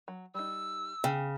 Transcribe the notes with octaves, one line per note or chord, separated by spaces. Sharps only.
F#3
G3 D#4 E6
C#3 G5